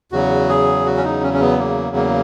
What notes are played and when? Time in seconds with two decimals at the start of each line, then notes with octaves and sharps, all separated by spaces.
0.12 E2 C#3 F#3 F#4
0.49 G#4
0.86 F#4
0.97 C#4
1.04 D#4
1.23 C#4
1.34 C#4
1.41 B3
1.59 A#3
1.96 A#3